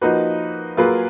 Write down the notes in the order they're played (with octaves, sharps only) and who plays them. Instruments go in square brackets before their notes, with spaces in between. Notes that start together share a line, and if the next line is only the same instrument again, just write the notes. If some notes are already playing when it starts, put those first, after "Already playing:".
[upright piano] F3 A#3 D#4 F#4 B4
F#3 A#3 F4 G#4 B4